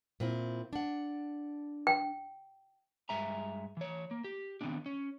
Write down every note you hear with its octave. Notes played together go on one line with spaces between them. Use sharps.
A#2 C4 E4
D4 F#5
G5
G2 G#3 E5 G#5 A#5
E3 C#5
A#3
G4
D#3 E3 B3 C4 D4
C#4